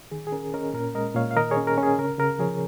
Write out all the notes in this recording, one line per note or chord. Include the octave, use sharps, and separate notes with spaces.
D#3 G#4
G#4
C#4 A#4
C#4 A#4 D#5
A#2 A#4
G#3 A#4 D#5
A#2 C#5 F5
F5
D#3 A#4 D#5
G#4 C#5
C#4
A#4
C#4
G#4
C#3 A#4
C#3 A#4
F3 G#4 C#5